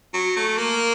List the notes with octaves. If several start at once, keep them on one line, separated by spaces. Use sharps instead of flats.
F#3
A3
A#3